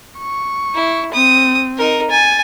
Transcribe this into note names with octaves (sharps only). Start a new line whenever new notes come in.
C#6
E4
C4 D#6
D#4 A#4
G#5 A6